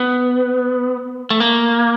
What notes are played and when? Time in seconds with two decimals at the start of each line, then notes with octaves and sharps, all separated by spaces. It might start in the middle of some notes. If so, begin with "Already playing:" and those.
Already playing: B3
1.30 A3
1.40 A#3